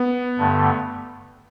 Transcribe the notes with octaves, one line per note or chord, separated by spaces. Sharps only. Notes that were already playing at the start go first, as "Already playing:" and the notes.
Already playing: B3
G2 D3 A3